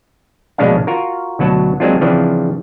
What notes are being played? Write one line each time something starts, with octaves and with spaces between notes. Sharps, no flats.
A#1 B2 G#3 C#4 D4 F5
F4 F#4 A#4
D2 B2 F#3 F#5 A5
F#3 G#3 A#3 C4 D4 F4
C#3 E3 F3 C4 D4